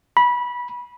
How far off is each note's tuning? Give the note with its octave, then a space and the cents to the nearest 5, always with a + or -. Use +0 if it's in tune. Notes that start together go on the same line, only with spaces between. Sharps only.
B5 -20